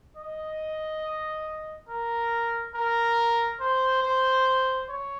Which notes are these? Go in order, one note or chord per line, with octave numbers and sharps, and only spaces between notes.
D#5
A#4
A#4
C5
C5
C#5